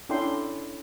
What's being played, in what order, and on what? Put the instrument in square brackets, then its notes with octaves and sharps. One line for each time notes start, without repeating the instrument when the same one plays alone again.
[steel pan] C#4 D4 E4 A4 G5 C6